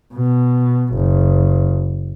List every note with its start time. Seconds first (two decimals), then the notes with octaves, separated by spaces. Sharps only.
0.14 B2
0.94 F#1